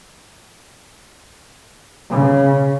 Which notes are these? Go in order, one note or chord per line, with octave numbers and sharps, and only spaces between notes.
C#3